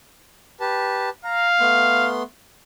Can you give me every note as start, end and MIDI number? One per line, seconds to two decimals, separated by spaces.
0.60 1.09 67
0.60 1.09 71
0.60 1.09 81
1.25 2.10 77
1.25 1.48 82
1.60 2.23 57
1.60 2.23 59
1.60 2.23 84